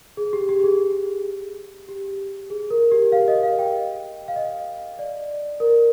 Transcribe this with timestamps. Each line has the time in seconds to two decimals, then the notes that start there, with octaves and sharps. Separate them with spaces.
0.17 G#4
0.33 G4
0.49 G4
0.63 G#4
1.89 G4
2.50 G#4
2.70 A#4
2.91 G4
3.12 F5
3.28 D#5
3.43 F5
3.59 G5
4.28 F5
4.36 D#5
4.99 D5
5.60 A#4